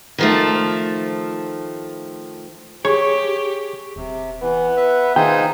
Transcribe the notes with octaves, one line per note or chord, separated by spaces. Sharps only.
D#3 F3 A3
G4 G#4 C#5 C#6
D#1 C3
E3 B3
B4 E5
D#3 D#4 F4 G#4 C5 G5